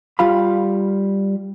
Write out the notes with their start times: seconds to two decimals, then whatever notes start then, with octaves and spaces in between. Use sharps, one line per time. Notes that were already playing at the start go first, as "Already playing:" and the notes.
0.19 G3 F4 F5 B5